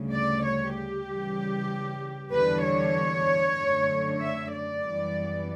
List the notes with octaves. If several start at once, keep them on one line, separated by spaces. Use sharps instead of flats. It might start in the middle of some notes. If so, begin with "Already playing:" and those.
Already playing: D2 C#3 G3
D5
C#5
G4
C#3 E3 G3
E2 D3 G3 D4 B4
C#5
F#2 D3 A3
E5
D5
F#2 E3 G3 B3